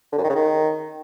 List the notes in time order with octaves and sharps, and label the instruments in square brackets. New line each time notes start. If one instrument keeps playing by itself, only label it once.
[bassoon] D3
F#2
D#3
C#3
D#3